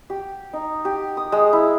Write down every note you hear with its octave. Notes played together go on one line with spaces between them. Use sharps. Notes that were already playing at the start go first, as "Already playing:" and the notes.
G4
D#4
G4
D#6
G#3
E4